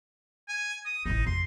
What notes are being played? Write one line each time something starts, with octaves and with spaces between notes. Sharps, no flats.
G#5
D#6
A1 C4 D#4
F2 C6